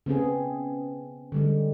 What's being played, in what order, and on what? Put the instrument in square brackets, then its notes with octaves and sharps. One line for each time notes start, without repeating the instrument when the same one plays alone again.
[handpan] C#3 B3 C4 G#4
D3 G3 G#3